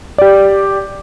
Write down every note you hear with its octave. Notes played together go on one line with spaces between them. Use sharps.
G4 D5